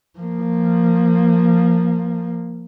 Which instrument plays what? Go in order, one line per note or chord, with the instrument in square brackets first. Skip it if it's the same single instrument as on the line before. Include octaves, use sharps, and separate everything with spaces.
[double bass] F3 A#3